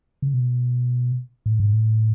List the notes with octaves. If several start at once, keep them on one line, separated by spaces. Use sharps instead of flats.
C#3
B2
A2
G#2
A2